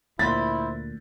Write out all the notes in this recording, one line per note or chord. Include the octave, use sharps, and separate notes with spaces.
D2 A#2 E4 C5 B5 A6